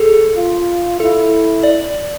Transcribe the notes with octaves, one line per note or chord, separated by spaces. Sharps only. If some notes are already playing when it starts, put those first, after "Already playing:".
Already playing: G#4 A4
F4
E4 A4
D5